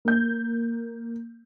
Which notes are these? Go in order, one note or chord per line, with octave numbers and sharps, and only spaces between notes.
A#3 G6